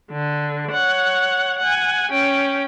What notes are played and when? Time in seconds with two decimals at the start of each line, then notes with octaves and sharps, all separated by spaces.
0.12 D3
0.71 C#5 F#5
1.59 F#5 G#5
2.11 C#4 G5